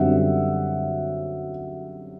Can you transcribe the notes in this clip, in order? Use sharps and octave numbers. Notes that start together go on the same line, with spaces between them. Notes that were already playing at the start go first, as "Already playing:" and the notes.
Already playing: F#2 D3 G3 C4 E5 F#5